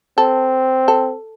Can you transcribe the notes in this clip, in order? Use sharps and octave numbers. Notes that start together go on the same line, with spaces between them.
C4 A4
A4